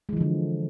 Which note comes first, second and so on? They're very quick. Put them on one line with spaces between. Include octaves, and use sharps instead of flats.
G#3 E3 F3 D3